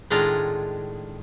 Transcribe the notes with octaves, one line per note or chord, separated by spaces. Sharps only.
A2 D#3 G#3 D4 F4 A#5